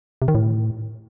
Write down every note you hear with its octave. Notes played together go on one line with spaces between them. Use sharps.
C3
D#3
A2